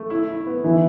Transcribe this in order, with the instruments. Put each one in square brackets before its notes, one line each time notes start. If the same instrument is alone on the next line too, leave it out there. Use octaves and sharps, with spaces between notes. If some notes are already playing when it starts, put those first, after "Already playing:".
Already playing: [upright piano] A3
E4
E4
B3
[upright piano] E3 [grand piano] E4